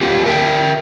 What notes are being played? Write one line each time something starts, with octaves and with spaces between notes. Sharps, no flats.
A#3 F4 G4
A#4 E5 G5